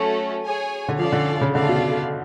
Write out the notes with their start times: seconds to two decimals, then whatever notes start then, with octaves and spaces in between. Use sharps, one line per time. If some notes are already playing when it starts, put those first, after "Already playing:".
Already playing: F#3 A3 C#4 F#4 A4
0.43 G#4 C#5 G#5
0.88 D3
0.99 F3 C#4 F4 A4 D5 F5
1.12 D3
1.41 C#3
1.54 D3 A3 F4 A4 D5 F5
1.69 B2